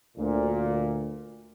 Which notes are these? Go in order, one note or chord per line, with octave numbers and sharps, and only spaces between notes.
D2 A#2